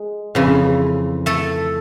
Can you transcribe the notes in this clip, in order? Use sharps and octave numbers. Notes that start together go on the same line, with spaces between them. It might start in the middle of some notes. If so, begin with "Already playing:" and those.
Already playing: G#3
F2 C#3 E3
A3 A4